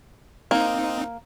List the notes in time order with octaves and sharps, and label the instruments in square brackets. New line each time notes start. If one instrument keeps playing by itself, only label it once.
[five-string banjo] A#3 [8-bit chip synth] C4 D#4